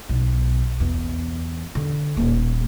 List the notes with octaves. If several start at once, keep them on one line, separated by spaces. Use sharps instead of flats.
B1
E2
D3
D#1 A#3